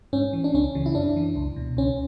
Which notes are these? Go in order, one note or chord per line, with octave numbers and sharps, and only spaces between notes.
G#2 C#4
E3
D4
C#2 C#4
C#3 E3
E4
F#2 D4
E3
C#2
B2
C#2 C#4